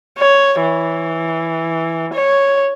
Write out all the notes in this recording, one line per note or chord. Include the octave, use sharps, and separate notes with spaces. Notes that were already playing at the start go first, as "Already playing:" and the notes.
C#5
E3
C#5